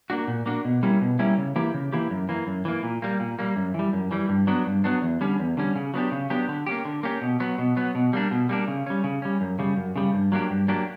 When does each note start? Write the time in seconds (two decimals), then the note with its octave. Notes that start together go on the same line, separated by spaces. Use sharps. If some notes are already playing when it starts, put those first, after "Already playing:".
0.10 A#3 D4 F#4
0.28 A#2
0.46 A#3 D4 F#4
0.65 B2
0.83 G3 A#3 C#4 E4
1.01 B2
1.19 G3 A#3 C#4 E4
1.38 C#3
1.56 E3 A#3 E4 G4
1.74 C#3
1.92 E3 A#3 E4 G4
2.10 F#2
2.29 E3 A#3
2.47 F#2
2.65 E3 A#3
2.83 A#2
3.02 G3 A#3
3.20 A#2
3.39 G3 A#3
3.56 F#2
3.74 E3 G3
3.93 F#2
4.11 E3 G3
4.29 G2
4.47 F#3 B3 D4
4.66 G2
4.84 F#3 B3 D4
5.02 E2
5.21 D3 G3 C#4
5.39 E2
5.57 D3 G3 C#4
5.76 C#3
5.94 F#3 B3 D4 G4
6.12 C#3
6.30 F#3 B3 D4 G4
6.49 D3
6.67 A#3 C#4 G4
6.85 D3
7.03 A#3 C#4 G4
7.21 B2
7.40 F#3 B3
7.58 B2
7.77 F#3 B3
7.95 B2
8.13 G3 A#3 D4
8.31 B2
8.49 G3 A#3 D4
8.68 C#3
8.86 G3 C#4
9.04 C#3
9.22 G3 C#4
9.41 F#2
9.59 C#3 G3
9.77 F#2
9.96 C#3 G3
10.14 G2
10.32 F#3 A#3 D4 G4
10.50 G2
10.68 F#3 A#3 D4 G4